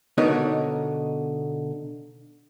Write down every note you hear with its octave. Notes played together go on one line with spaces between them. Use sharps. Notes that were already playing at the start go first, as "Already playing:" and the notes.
B2 D3 B3 D#4 A#4 C#5